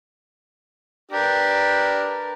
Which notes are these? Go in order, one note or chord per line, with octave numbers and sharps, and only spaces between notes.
D4 G4 A#4 B4